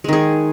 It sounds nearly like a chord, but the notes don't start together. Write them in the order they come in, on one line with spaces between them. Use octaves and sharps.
G#3 D#3 G#4